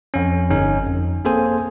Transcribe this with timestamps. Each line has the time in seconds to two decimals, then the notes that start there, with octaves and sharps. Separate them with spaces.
0.14 F2 C#4
0.50 G1 C#4 D#4
0.86 F2
1.25 A#3 C4 G#4 A4 C5 G#5